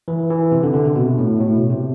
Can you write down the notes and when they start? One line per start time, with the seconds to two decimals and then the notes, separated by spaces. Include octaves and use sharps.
0.08 E3
0.30 E3
0.52 C3
0.63 D3
0.74 D3
0.85 C3
0.96 B2
1.19 A2
1.41 A2
1.55 B2
1.70 C3